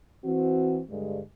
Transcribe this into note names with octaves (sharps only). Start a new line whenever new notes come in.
E3 C4 F#4
G2 D3 G#3